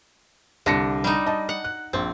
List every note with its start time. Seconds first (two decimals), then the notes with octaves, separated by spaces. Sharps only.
0.66 C2 D3 A#6 C#7
1.04 G3 D#4
1.26 D#5 A5
1.49 F#5
1.64 F#6
1.93 A#1 C4